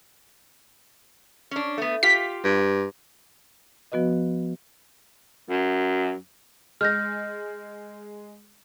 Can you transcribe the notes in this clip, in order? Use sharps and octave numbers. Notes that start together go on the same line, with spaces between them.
C#4 D4
A3 B3
F4 G4 F5 B6
G2
F3 B3 F#4 B4 D#5
F#2
G#3 F6 G6 A#6